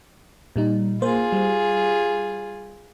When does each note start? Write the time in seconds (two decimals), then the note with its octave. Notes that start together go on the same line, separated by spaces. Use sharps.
0.56 A#2 G3 D#4
1.02 A#3 F4 G#4 C5
1.32 G3